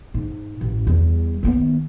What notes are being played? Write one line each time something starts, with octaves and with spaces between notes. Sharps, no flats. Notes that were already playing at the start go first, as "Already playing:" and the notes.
G#2
A1 F#2
E2 G3
D#3 B3